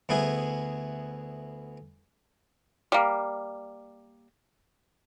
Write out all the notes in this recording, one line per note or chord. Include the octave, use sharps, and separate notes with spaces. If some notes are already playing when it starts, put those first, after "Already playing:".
D2 B3 E4 G#4
G3 A#3